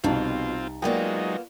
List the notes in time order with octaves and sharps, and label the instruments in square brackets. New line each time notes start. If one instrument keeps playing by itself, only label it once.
[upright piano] C2 D#4 A5 [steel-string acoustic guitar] F2 B2 [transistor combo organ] C4 F4
[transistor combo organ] F#3 G#3 D#4 [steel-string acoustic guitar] A#3 B3 F4 [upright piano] D5 G5